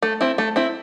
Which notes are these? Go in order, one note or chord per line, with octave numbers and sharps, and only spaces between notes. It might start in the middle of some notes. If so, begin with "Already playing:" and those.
A3
C4 E4
A3
C4 E4